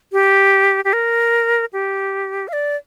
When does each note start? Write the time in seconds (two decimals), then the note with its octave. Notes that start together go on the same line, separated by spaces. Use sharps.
0.12 G4
0.85 G4
0.93 A#4
1.73 G4
2.48 F5
2.53 D5